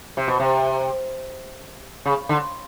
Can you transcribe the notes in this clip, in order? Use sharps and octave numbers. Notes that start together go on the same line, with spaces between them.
C3
B2
C3
C#3
D3